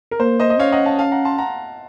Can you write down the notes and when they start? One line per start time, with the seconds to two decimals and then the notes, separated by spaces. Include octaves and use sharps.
0.11 A#4
0.20 A#3 C5
0.40 C5 D#5
0.50 D#5
0.59 C#4 C#5 F5
0.72 D#5 F#5
0.85 F5 A5
0.99 F5 A5
1.12 F#5 A#5
1.25 A5 C6
1.38 F#5 A#5